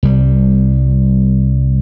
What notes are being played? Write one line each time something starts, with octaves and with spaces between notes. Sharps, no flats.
C2 G3